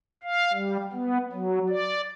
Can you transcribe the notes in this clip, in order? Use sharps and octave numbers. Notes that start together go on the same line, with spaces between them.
F5
G3
B3
F#3
D5